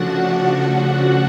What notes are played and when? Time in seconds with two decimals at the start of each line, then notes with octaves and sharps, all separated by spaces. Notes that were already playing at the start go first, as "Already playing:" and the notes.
Already playing: C#3 F3 A3 D4 F#4 F#5